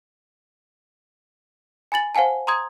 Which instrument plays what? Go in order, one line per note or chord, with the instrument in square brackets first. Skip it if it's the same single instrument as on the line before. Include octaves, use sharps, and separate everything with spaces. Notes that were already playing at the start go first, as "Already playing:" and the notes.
[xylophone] G#5 B5 A6 F#7
C5 F5 F#5 G#5 A5
A#5 C6 D#6 G#6